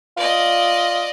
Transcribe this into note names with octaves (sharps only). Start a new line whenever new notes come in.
F4 D5 D#5